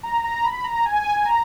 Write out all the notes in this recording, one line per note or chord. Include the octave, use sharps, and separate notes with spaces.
A#5
A#5
B5
A#5
G#5
A#5